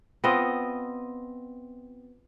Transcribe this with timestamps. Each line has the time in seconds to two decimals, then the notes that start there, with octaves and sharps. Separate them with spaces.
0.24 B3 C4 F4 D#5